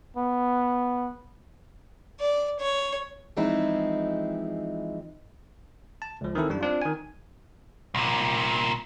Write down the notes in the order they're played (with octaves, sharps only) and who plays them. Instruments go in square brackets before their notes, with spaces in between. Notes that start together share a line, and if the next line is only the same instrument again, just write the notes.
[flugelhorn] B3
[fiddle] D5
C#5
[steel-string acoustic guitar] E3 F3 G#3 C4 D#4 E4
[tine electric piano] A5
C#2 F3
D#3 E3 C4 E4 A4
F#2 G3 D4
C4 D4 F4
D#3 G#5
[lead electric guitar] C2 A#2